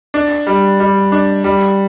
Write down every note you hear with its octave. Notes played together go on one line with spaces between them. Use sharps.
D4
G3
G3
D4
G3